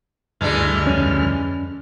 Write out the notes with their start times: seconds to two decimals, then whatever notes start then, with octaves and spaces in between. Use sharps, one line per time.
0.41 D2 G2 E3 G#3 D4 F6
0.86 F2 C#4